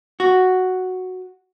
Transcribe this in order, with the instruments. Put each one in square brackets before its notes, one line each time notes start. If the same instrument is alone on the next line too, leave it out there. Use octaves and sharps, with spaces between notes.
[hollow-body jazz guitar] F#4